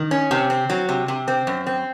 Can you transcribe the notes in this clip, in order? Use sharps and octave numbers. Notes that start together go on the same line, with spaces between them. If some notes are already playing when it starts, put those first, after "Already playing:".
Already playing: D#3
C#4
C3
C4
F#3
C3
C3
C4
F#2
C4